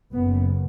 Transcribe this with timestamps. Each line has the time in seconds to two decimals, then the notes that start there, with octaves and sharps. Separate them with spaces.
0.13 F#1 F#2 C#3 B3